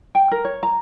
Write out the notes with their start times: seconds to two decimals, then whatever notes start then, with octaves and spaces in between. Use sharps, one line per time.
0.15 G5
0.31 A#4
0.45 C#5
0.63 A#5